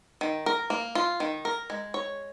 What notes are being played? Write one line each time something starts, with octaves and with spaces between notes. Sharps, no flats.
D#3
A#4
A#3
F4
D#3
A#4
G#3
C#5